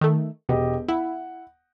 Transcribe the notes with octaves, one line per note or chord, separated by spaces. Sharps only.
D#3 A3
E1 B2 G4 D#5
E4 F#5